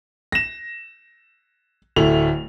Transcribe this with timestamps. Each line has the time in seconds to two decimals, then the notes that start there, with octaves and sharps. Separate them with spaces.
0.32 A#6 E7
1.96 D1 A3 E4 F7